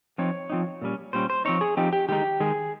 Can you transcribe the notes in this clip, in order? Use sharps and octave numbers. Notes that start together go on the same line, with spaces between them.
F3 C4 D#4 C#5
F3 C4 D#4
A#2 G3 C#4
A#2 G3 C#4 C5
C5
F3 C4 D#4 C#5
G#4
F3 C4 D#4 G4
G4
D#3 G#3 D#4 G4
D#3 G#3 D#4 G#4